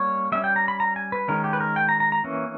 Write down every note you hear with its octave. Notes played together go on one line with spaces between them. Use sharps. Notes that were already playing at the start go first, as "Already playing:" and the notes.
Already playing: G3 A#3 C#4 C#5
G3 C#4 E5
G5
A#5
B5
A#5
G#5
B4
D#3 G#3 C#4 A#4
G4
B4
A#4
G5
A#5
A#5
A#5
E3 A#3 C#4